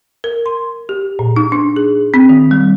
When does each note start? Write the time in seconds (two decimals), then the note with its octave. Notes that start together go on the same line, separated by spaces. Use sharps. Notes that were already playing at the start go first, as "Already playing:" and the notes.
0.24 A#4
0.46 C6
0.89 G4
1.19 A#2
1.36 D#4
1.52 D4
1.76 G#4
2.14 C4
2.29 D#3
2.51 G3